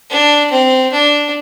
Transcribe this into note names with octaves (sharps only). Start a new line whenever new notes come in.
D4
C4
D4